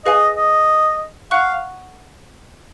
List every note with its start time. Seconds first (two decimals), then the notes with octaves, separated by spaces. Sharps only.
0.05 G#4 B4 D#5 F5 G#5
0.36 D#5
1.31 F5 F#5 C#6 F#6